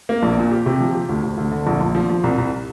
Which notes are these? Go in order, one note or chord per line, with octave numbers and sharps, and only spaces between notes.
A#3
A#1
A#2
G4
C3
F3
G4
D2
D2
D2
D3
A#1
A#1
F3
F3
C2
C2